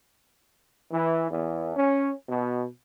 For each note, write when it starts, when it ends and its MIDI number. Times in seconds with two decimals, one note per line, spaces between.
0.92 1.27 52
1.30 1.76 40
1.76 2.11 61
2.29 2.66 47